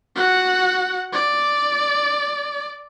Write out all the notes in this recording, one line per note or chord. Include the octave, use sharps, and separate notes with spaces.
F#4 F#5
D5